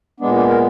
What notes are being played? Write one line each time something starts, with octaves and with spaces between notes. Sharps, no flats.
A#2 G#3 B3 D4
D4
A#4